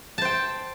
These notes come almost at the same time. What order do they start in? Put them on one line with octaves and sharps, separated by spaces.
A5 C5 G5